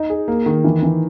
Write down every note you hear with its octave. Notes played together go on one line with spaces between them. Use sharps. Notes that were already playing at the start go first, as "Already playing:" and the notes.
Already playing: D#4
G#4
A#3
D#3
E3
E3